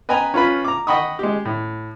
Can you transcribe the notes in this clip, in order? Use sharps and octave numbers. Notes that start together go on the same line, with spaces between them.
B4 D#5 G5 G#5 A#5 B5
C#4 F4 B4 B5
A#5 D6
D#5 F#5 G5 B5 C#6 D#6
G#3 G4
A2